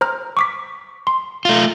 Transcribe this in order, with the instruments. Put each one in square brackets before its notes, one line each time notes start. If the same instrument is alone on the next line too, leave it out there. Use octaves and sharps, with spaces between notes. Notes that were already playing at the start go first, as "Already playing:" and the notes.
[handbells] C5 A#5 F6
C#6 D6 B6
C6
[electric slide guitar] A3 F4